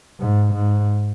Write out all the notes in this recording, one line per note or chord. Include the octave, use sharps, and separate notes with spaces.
G#2
G#2